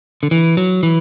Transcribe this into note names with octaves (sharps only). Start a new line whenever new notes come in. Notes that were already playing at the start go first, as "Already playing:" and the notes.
D3
E3
F#3
E3